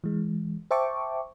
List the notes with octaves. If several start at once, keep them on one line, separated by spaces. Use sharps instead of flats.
E3 G#3
C5 E5 G5 A5 C#6 D6